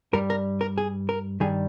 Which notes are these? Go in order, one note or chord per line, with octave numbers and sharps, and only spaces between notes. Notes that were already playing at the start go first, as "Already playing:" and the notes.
G2 G3 A#4
A#4
A#4
G#4
A#4
G2 D#3 G3 G#4